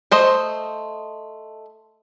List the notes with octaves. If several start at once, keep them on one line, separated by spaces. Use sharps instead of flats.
A3 C5 D#5